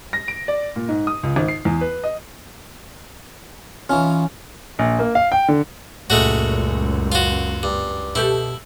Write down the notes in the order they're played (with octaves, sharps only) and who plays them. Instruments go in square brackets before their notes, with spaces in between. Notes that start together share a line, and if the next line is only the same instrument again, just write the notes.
[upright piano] A#6
D7
D5
A#2
G#2
D#6
C#2
G#1
C7
E2
B4
D#5
[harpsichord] E3 D#4 F4 [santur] C#4
[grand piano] A#1
A#3
F5
G5
D3
[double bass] C#2 F#2 [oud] A#2 [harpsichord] G#3 A3 F#4
[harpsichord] F4 F#4
G2
[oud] B2 G4 A4 [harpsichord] E4